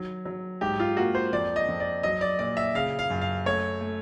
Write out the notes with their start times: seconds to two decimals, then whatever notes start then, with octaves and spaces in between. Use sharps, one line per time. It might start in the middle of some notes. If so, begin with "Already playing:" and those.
Already playing: D#3 F#3
0.25 F#3
0.61 G#2 G4
0.79 F4
0.97 A#3 F#4
1.15 C5
1.33 F2 D5
1.56 D#5
1.68 F2
1.80 D5
2.03 F#3 D#5
2.21 D5
2.39 A#2 D5
2.57 E5
2.75 C#3 F5
2.99 F5
3.10 F#2
3.21 F5
3.46 A3 C#5
3.81 A3